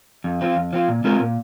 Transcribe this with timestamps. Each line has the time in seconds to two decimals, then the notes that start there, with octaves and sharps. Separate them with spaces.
0.24 F2
0.41 F3 C4 F4
0.56 F2
0.73 F3 C4 F4
0.88 A#2
1.04 G#3 C4 F4 A#4
1.20 A#2